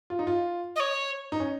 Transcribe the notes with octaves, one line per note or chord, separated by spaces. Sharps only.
F4
D#4
F4
D#5
C#5
D#4
C#4